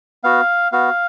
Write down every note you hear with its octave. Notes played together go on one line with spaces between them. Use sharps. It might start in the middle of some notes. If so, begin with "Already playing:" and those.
B3 F#4 F5
B3 F#4 F5